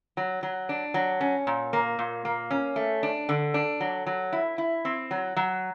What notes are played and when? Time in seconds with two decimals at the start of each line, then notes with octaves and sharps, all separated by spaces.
0.17 F#3
0.43 F#3
0.69 D4
0.94 F#3
1.21 C#4
1.47 A#2
1.73 A#3
1.99 A#2
2.25 A#3
2.51 C#4
2.76 A3
3.03 D4
3.29 D3
3.54 D4
3.80 F#3
4.06 F#3
4.33 E4
4.58 E4
4.85 C4
5.11 F#3
5.36 F#3